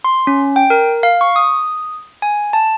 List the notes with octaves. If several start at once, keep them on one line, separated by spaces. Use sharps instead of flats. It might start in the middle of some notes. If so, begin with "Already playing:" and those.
C6
C#4
G5
A#4
F5
C#6
D#6
G#5
A5